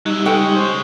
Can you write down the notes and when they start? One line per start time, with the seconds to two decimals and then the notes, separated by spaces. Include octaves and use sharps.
0.06 F#3 G3 D#4 E4
0.25 C#3 G#3 A4 B4 G5 C#6
0.55 C5